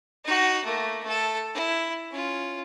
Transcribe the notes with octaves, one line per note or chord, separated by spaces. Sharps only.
D#4 F#4
A3 A#3
A3 A4
E4
C#4 F4